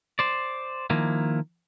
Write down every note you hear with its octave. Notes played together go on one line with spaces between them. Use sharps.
C5 D5
D#3 F3 A#3 E4